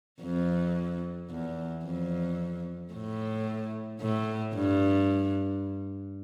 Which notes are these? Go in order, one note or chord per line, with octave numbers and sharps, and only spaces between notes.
F2
E2
F2
A2
A2
G2